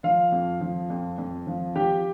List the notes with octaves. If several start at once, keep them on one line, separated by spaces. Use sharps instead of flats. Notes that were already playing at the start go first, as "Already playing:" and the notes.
F3 F4 F5
F2
F3
F2
F2
F3
F3 G4 G5